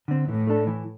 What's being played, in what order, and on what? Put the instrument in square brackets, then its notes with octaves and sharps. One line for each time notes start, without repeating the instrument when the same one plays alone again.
[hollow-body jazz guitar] D3 C4
[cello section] A2 [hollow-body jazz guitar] E3
[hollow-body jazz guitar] A3 D4 A4
E3